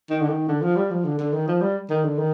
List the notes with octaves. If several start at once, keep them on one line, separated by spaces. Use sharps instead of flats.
D#3
D3
D#3
D3
F3
G3
F3
D3
D3
D#3
F3
G3
D#3
D3
D#3